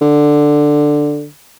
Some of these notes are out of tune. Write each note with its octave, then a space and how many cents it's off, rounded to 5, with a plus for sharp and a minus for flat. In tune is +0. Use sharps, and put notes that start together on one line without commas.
D3 +5